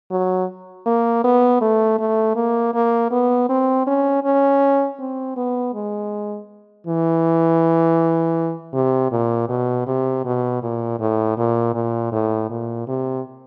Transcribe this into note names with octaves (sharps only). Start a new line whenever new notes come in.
F#3
A#3
B3
A3
A3
A#3
A#3
B3
C4
C#4
C#4
C4
B3
G#3
E3
C3
A#2
B2
C3
B2
A#2
A2
A#2
A#2
A2
A#2
C3